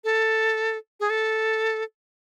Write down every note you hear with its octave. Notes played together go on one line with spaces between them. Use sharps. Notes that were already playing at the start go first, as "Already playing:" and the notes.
A4
G#4
A4